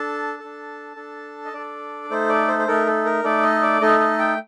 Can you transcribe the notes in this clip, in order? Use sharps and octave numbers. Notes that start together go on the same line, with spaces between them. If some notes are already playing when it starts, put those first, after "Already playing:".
Already playing: D4 A4 A5
D4 A4
D4 A4
D#5
D4 A4 D5
A3 D#4 A4 C5
D5
C5
C5
A3 D#4 A4 A#4
A4
A#4
A3 D#4 A4 D5
D#5
D5
A3 D#4 A4 D#5
D#5
G5